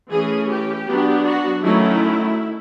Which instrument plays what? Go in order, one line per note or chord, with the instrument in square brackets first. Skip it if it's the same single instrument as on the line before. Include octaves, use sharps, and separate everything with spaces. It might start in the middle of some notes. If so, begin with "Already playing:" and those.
[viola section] E3 A3 C#4 G#4
G4
F#3 B3 D4
F#4
D#3 F#3 A3 C#4 E4